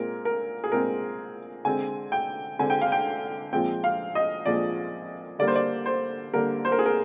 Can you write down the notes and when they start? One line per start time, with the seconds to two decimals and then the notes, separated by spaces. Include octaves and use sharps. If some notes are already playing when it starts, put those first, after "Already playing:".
Already playing: A#2 G#3 C4 A#4
0.25 A#4
0.64 G#4
0.72 A#2 G#3 C4 A#4
1.65 D3 G#3 C4 G#5
2.12 G5
2.58 D3 G#3 C4 G#5
2.70 G5
2.81 F5
2.92 G5
3.53 A#2 F3 G#3 C4 G5
3.84 F5
4.15 D#5
4.46 A#2 F3 G#3 C4 D5
5.39 D3 G3 A#3 D5
5.48 C5
5.56 D5
5.86 C5
6.33 D3 G3 A#3 A#4
6.65 C5
6.72 A#4
6.79 G#4
6.86 A#4